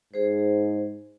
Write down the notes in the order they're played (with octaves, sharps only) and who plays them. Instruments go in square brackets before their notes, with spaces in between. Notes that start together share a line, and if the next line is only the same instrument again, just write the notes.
[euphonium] G#2 [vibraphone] G#4 C5